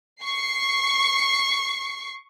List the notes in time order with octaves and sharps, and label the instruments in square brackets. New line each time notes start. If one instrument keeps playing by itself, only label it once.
[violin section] C#6 C7